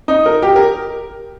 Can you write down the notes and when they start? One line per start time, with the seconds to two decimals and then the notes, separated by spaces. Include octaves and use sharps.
0.08 D#4
0.26 A#4
0.42 G4
0.56 A#4